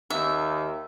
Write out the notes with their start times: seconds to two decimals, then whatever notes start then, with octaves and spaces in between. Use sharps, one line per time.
0.10 D#2 E5